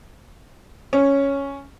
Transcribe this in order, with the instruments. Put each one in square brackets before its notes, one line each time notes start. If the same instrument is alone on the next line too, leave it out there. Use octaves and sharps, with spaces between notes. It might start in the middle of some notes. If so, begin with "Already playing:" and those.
[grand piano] C#4